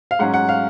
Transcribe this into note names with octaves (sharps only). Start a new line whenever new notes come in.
F5
G#2 F#3 C#4 F#5
F#5
F5